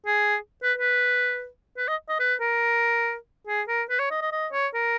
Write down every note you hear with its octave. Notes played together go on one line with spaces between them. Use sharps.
G#4
B4
B4
B4
D#5
D#5
B4
A#4
G#4
A#4
B4
C#5
D#5
D#5
D#5
C#5
A#4